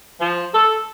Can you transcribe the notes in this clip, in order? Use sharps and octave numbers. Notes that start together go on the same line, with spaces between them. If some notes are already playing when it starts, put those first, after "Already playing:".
F3
A4